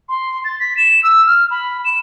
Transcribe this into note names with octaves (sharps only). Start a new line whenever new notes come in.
C6
A6
B6
E7
E6
F6
B5
E7